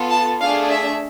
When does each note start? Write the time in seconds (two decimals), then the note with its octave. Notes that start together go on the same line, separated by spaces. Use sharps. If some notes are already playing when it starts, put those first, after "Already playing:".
Already playing: B3 F4 A4
0.11 A5
0.40 A3 D4 G#4 F5
0.70 E5